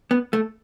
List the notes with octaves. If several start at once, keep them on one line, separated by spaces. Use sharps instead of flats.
B3
A3